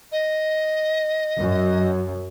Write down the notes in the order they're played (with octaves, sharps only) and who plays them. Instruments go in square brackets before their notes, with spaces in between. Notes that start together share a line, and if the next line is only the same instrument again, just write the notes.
[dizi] D#5
[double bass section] F#2